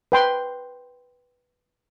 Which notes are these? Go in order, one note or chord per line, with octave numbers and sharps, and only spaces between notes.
B4 G5 C6